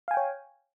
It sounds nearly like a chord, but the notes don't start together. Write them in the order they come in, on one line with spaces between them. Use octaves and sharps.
F5 G#5 G5 C#5